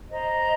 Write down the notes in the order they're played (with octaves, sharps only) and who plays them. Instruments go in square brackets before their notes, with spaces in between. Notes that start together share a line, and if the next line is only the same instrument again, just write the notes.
[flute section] C5 D#5 A#5